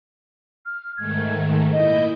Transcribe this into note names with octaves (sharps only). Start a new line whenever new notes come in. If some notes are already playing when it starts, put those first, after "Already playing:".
F6
G#2 D#3 A3 G#6
A#2 E4 D#5 G6